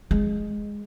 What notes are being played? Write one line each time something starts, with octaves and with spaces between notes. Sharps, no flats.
G#3